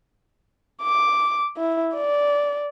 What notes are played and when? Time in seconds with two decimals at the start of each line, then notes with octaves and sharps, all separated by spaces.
0.83 D6
1.58 E4
1.95 D5